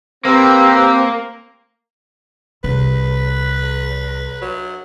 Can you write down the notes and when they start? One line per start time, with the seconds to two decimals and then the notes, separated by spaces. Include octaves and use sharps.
0.25 A#3 C4 G4 B4 E6
2.64 C2 B4
4.42 F#3